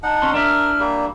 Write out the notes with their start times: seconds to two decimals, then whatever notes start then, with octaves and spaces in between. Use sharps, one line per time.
0.03 D#4 F#5 A5
0.22 C#4 C6
0.34 D4 E4 A#4 E5 F6
0.80 G3 A#3